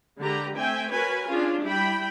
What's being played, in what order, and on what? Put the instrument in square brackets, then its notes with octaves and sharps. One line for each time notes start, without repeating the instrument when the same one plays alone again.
[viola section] D3 G#3 G4 B4 A#5
A3 C4 E5 G5 G#5
F#4 A#4 B4 C#5 G#5
C#4 D4 F4 G#4
G3 E4 G5 B5